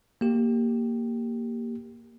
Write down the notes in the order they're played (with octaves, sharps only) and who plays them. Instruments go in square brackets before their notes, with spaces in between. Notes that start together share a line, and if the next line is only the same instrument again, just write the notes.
[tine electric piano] A#3 G4